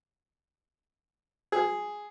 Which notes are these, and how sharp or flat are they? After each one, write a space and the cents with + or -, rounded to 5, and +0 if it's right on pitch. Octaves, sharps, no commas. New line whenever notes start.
G#4 +0 E6 -35